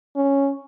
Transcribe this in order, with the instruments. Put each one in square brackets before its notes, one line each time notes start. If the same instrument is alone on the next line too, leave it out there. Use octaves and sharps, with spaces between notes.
[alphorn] C#4